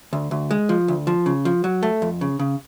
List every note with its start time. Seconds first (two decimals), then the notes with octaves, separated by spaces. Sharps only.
0.13 D2
0.31 D2
0.51 G#3
0.69 F3
0.88 D2
1.07 F3
1.26 C#3
1.45 F3
1.64 F#3
1.83 A3
2.02 F2
2.21 C#3
2.39 C#3